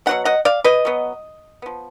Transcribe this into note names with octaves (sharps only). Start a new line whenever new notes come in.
B2 F#3 B3 F#5
D#5 F#5
D5 F5
B4 D#5
B2 F#3 B3
F3 B3